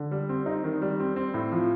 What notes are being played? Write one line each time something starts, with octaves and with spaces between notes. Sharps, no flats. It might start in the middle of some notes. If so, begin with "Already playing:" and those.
Already playing: D3
G3
C4
D#4
D#3
G3
C4
C4
A2
F3